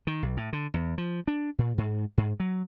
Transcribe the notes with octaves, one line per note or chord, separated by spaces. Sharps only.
D#3
B1
A2
D3
E2
F3
D4
A#2
G#2
G#2
F#3